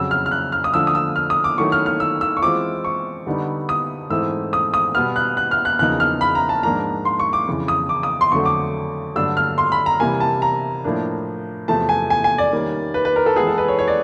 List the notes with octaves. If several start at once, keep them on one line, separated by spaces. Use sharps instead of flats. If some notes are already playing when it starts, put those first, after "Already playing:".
Already playing: F2 C#3 F#3 E6
F6
F6
F#6
F6
D#6
D3 F3 A3 D4 E6
D#6
E6
F6
D#6
D6
D#3 F#3 A3 C#4 E4 C#6
F6
F6
E6
E6
C#6
E3 G#3 C4 F4 D6
C#6
D3 G3 B3 D#4
D#6
G#2 E3 A3 C4 E6
D#6
D#6
B2 G3 B3 F6
F#6
F#6
F6
F#6
E2 C#3 F3 A#3 D#4 F#6
F6
B5
A#5
A5
G#2 F3 A#3 D4 F4 A#5
C6
C#6
D6
F2 C#3 E3
D#6
D6
D#6
C6
F2 D3 F#3 A3 C#6
D6
G2 D3 F#3 A3 D4 E6
F6
C6
B5
A#5
C3 E3 G3 A#3 G#5
A5
A#5
A2 F3 A#3 D4
E2 C3 F3 A3 A5
G#5
G#5
G#5
D5
D#3 G3 A#3 C#4
B4
B4
A#4
A4
E3 G#3 B3 E4 G#4
A4
B4
C#5
C#5
D5